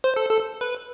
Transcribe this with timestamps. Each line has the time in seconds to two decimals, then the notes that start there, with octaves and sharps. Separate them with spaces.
0.04 C5
0.16 A4
0.29 A4
0.61 B4